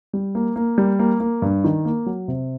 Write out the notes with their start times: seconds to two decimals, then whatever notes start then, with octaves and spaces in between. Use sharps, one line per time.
0.13 G3
0.35 A#3
0.56 A#3
0.78 G3
0.99 A#3
1.20 A#3
1.42 G2
1.64 D#3
1.85 A#3
2.06 F#3
2.28 C3